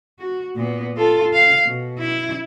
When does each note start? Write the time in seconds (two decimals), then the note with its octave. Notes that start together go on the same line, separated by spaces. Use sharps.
0.19 F#4
0.56 A#2 B3
0.97 F4 A4
1.33 F5
1.66 B2
1.99 E4